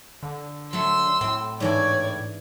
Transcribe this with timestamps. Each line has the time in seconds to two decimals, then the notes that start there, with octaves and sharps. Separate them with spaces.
0.23 D3
0.73 F#3 A3 C6 E6
1.21 A2 C4
1.60 G#2 E3 D4 C#5 D5 G#6